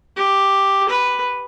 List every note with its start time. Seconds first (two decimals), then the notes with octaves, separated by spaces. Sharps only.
0.17 G4
0.89 B4